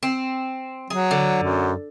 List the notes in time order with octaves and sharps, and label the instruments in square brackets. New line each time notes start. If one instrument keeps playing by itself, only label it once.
[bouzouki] C4
[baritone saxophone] F#3 [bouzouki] G#4
[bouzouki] D3
[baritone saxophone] F#2